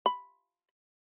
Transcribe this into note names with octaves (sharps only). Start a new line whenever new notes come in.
B5